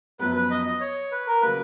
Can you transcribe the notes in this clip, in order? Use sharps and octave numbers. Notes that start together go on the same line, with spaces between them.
F#2 F3 B3 B4
B4
D#5
D#5
C#5
B4
A#4
C#3 F#3 A#3 F4 B4